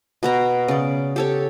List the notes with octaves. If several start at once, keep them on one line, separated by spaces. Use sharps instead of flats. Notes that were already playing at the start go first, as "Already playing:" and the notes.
B2 B3 A#5
C#3 D5
G4 A4 C#5